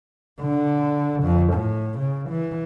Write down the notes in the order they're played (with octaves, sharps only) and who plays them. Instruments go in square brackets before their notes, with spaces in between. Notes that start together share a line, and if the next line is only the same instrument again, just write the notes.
[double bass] D3
F2
A2
C#3
E3